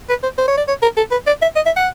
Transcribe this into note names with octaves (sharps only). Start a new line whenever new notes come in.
B4
C5
C5
C#5
D5
C#5
A#4
A4
B4
D5
E5
D#5
E5
F#5